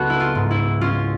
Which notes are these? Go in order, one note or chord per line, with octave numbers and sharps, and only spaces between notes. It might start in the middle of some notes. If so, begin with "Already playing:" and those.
Already playing: C#2 B3 F#4 A4
E4
F4
G#2
E4
C#4 F4